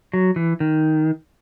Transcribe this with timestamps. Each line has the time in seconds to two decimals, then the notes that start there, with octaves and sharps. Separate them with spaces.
0.13 F#3
0.36 E3
0.60 D#3